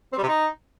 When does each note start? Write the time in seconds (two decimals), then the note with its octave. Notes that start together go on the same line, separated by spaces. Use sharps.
0.13 C4
0.18 G3
0.23 C3
0.28 D#4